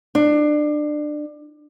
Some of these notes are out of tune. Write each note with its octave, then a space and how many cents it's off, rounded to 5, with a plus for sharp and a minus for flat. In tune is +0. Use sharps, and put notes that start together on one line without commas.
D4 +25